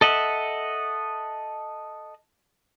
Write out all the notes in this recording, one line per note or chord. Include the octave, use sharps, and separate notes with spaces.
A4 D#5 E5 F#5